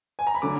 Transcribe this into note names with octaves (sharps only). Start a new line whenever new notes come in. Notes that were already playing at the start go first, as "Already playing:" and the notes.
G#5
A#5
B5
D3 F#3 D6